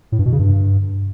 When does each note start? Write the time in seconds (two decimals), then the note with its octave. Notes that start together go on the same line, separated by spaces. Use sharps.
0.12 A2
0.19 G2
0.26 B2
0.32 C#3
0.39 G2